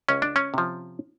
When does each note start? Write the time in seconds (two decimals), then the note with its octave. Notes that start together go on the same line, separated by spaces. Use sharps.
0.09 C#2 C#4
0.22 D4
0.36 C#4
0.54 C3 F3